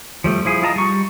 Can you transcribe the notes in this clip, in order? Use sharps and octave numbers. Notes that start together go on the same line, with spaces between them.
F3 G3 A3
F3 E4 G#4
F4 D#5 A5 A#5
G3 C#6